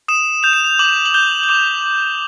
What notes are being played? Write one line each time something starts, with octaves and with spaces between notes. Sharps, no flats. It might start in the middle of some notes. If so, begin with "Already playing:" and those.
D#6 E7
G6 F7
E7
F7
D6 F#7
F#7
G6 G7
F#7
D6 F7